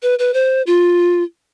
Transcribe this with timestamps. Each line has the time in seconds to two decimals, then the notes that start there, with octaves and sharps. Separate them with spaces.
0.02 B4
0.19 B4
0.34 C5
0.67 F4